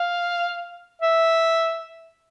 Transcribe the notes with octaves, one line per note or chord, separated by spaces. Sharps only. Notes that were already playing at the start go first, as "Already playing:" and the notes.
Already playing: F5
E5